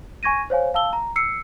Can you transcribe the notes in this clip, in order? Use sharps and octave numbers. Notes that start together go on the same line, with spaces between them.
G#5 C#6 G#6 A#6 D#7
C5 C#5 F5 G#5
F5 A5 E6 G7
A#5
E6 C7 C#7